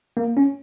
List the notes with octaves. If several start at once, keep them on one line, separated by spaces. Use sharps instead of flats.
A#3
C#4